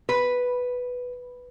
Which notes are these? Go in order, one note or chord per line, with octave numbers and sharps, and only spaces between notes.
B4